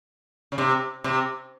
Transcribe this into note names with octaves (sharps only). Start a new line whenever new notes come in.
C#3
C3
C3